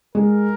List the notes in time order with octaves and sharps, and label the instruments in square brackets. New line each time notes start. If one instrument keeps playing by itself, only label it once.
[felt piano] G#3 [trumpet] A#4